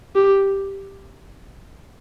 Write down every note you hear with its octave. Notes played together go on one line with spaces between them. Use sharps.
G4